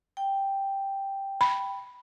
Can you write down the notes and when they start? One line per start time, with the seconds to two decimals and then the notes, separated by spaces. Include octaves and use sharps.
0.17 G5
1.41 B5